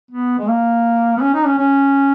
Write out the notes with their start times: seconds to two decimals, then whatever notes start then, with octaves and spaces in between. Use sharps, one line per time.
0.11 B3
0.39 G#3
0.48 A#3
1.17 B3
1.21 C#4
1.34 D#4
1.46 C#4
1.58 C#4